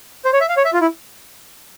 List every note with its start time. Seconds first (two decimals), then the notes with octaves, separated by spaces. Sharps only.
0.25 C5
0.33 C#5
0.41 E5
0.49 F5
0.57 C#5
0.65 E5
0.73 F4
0.81 E4